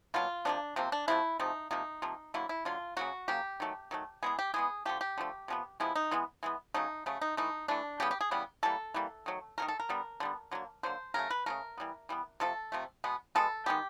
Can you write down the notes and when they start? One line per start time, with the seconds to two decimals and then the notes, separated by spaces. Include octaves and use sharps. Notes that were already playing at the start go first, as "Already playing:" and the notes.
0.14 B2 F#3 A#3 F4
0.45 C3 F3 A#3 D4
0.76 C3 F3 A#3 C4
0.92 D4
1.08 C3 F3 A3 E4
1.40 C3 F3 A3 D#4
1.71 C3 F3 A#3 D#4
2.02 C3 F3 A#3
2.34 D3 F#3 A#3 E4
2.49 E4
2.65 D3 F#3 A#3 F4
2.97 C#3 F#3 A#3 F#4
3.28 C#3 F#3 A#3 G4
3.60 D#3 F#3 A3
3.91 D#3 F#3 A3
4.23 E3 G#3 B3 G#4
4.39 G4
4.54 E3 G#3 B3 G#4
4.85 D3 F3 A3 G4
5.01 G4
5.18 D3 F3 A3
5.48 C3 F3 G#3 B3
5.80 C3 F3 G#3 B3 E4
5.95 D#4
6.11 E3 G#3 B3
6.43 E3 G#3 B3
6.74 C#3 F#3 A3 D#4
7.06 C#3 F#3 A3
7.21 D#4
7.37 E3 A3 D#4
7.68 E3 A3 D4
8.00 C#3 E3 G3 B3 G4
8.11 G4
8.21 G#4
8.31 C#3 E3 G3 B3
8.63 E3 G3 A#3 A4
8.94 E3 G3 A#3
9.26 D#3 F#3 A3
9.58 F#3 A3 A#4
9.62 D#3
9.68 A4
9.80 A#4
9.89 D3 G3 B3
10.20 D3 G3 B3
10.51 D3 F#3 A#3
10.83 D3 F#3 A#3 C5
11.14 C#3 F#3 A3 A#4
11.30 B4
11.46 C#3 F#3 A3 A#4
11.78 E3 G3 B3
12.09 E3 G3 B3
12.40 C3 F3 A3 A4
12.72 C3 F3 A3
13.04 B2 G#3 B3
13.35 B2 G#3 B3 A4
13.66 D#3 G#3 B3 G4